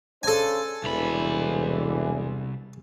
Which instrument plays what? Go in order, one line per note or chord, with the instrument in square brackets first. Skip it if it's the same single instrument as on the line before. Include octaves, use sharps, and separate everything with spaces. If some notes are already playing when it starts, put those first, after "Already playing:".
[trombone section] C#3 D4 C5 [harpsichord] A4 G#5
[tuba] E1 [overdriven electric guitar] C2 B5 [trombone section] D3 E3